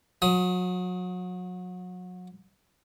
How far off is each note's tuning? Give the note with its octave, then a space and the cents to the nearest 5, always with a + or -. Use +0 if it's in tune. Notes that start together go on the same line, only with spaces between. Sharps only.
F#3 -30 D#6 +20